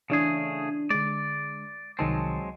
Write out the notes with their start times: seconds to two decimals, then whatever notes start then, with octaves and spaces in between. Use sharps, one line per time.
0.10 C#3 E3 A3 D4 G#4
0.90 D3 G#3 D5
1.99 C2 D#3 F#3 G#3 C4 A5